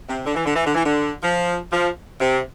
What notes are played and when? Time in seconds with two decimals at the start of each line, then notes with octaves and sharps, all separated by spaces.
0.09 C3
0.26 D3
0.35 E3
0.45 D3
0.55 E3
0.66 D3
0.75 E3
0.85 D3
1.23 F3
1.72 F3
2.20 C3